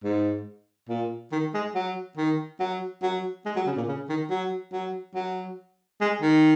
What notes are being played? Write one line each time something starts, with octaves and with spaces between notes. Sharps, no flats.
G#2
A#2
D#3
G#3
F#3
D#3
F#3
F#3
G#3
F#3
C#3
A#2
C#3
D#3
F#3
F#3
F#3
G#3
D#3